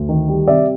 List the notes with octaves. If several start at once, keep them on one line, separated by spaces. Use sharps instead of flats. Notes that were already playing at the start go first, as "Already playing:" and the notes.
Already playing: D2
D#3
G3
C3 D5 E5